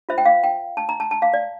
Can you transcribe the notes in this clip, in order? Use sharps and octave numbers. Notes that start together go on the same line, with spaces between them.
F4 C5 E5
G5
F5
G5
A5
A#5
A5
A5
F5
D5